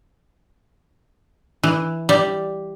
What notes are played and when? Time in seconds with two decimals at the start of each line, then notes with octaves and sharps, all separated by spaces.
1.63 E3
2.09 G3